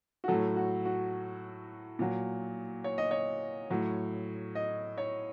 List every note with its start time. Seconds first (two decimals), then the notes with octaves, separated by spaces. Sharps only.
0.24 F#4
0.28 A2 F#3 A4
0.56 F#4
0.85 F#4
1.99 A#2 F#3
2.84 C#5
2.98 D#5
3.11 C#5
3.70 A2 F#3
4.55 D#5
4.98 C#5